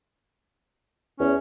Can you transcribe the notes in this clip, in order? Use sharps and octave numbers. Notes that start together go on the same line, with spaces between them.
E2 C#4